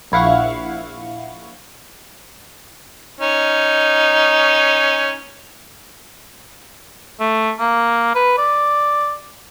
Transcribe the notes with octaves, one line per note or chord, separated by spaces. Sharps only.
A#1 E4 F5 F#5 C#6
C#4 D#4
A3
A#3
B4
D5